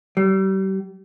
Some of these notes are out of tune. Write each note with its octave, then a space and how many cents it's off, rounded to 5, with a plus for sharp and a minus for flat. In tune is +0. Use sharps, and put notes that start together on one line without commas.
G3 -35